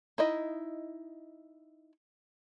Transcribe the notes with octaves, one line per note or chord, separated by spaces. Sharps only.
D#4 E4 D#5